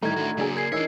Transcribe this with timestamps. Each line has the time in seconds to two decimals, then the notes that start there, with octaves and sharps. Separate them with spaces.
0.02 A2 D#3 E3 G3 A#5 G#6
0.16 D4 F#4
0.37 C#3 F#3 A#3 D4 G#4
0.56 A#4 G#6 C7
0.72 E3 D4 D#4 A#4 C#5 D#5 E6 C7